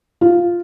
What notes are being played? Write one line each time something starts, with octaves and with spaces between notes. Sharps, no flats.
F4